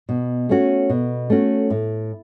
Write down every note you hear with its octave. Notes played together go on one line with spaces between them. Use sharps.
B2
A3 C#4 F#4
B2
A3 C#4 F#4
A2